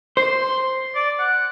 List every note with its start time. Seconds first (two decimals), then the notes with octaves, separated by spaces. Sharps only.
0.17 C5 C6
0.95 D5
1.19 F#5